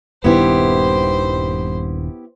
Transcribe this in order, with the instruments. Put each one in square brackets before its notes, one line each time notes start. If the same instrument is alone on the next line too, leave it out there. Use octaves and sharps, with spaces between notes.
[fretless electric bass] D#1 G2 D#3 [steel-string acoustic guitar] B3 E4 G4 [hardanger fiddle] C5